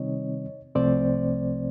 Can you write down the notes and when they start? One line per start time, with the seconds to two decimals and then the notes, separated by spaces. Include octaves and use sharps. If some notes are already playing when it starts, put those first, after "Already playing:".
Already playing: C3 D#3 G3 C4 D#4 C#5 D#5
0.75 C2 C3 F3 A3 C4 C5 D5